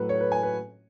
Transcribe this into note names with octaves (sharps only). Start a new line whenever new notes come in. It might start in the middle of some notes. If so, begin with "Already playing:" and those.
Already playing: A2 F#3 A3 A4 B4
C#5
B4
G#5
B4